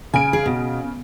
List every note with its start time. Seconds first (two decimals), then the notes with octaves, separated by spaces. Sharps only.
0.14 C#3 G#5 D7
0.33 G#4
0.46 B2